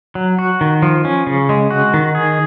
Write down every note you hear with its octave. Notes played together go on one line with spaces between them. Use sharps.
F#3
F#4
D#3
F3
C#4
C#3
G#3
F#4
D#3
G#4